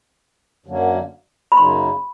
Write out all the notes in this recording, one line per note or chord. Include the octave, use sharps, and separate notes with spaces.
F#2 D3 F#3 A#3
B5
F#2 C#3 F#3 A#3 D#4 C6